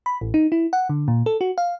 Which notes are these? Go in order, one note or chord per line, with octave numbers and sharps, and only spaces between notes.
B5
A1
D#4
E4
F#5
D3
A#2
A4
F#4
F5